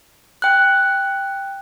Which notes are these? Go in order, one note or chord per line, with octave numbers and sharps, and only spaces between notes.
G5 F#6